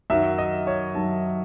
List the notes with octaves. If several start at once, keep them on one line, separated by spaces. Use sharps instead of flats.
F#2 D#3 F#3 E5
D#5
C#5
F#2 D#3 F#3 A5